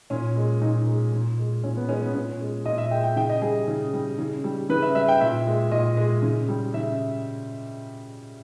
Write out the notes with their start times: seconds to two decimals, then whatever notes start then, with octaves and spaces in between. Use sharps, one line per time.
0.10 A#2 C#4
0.36 G#3
0.61 A#2 D#4
0.87 G#3
1.12 A#2
1.38 G#3
1.63 A#2 C#4
1.77 B3
1.89 G#3 C#4
2.02 B3
2.14 A#2 C#4
2.40 G#3
2.65 A#2 D#5
2.78 E5
2.91 G#3 G5
3.04 G5
3.16 C#3 G5
3.29 D#5
3.42 G3 G#4
3.68 C#3
3.93 G3
4.18 C#3
4.44 G3
4.69 C#3 B4
4.82 E5
4.95 G3 E5
5.08 G5
5.21 A#2 E5
5.46 G#3
5.71 A#2 D#5
5.97 G#3
6.23 C#3
6.49 G3
6.74 C#3 E5